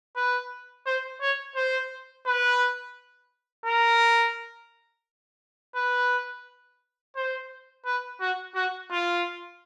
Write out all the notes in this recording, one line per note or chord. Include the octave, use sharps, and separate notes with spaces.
B4
C5
C#5
C5
B4
A#4
B4
C5
B4
F#4
F#4
F4